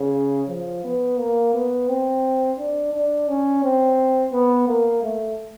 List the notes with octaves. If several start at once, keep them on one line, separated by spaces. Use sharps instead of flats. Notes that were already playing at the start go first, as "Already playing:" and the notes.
Already playing: C#3
F3
B3
A#3
B3
C4
D4
D4
C#4
C4
B3
A#3
A3